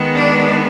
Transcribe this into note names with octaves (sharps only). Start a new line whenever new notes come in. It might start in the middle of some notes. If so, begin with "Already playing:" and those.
Already playing: D#3 G#3 B3
D4